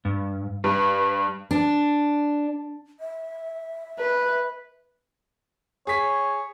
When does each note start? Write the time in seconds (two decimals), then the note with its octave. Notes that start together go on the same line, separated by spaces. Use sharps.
0.05 G2
0.64 G2 B4
1.51 D4
3.00 E5
4.00 B4
5.87 G#4 C#5 B6